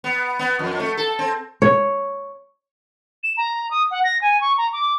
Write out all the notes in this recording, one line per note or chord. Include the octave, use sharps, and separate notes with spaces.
B3
B3
F2
A3
A4
C4
C#5
E7
A#5
D#6
F#5
A#6
G#5
C#6
A#5
D6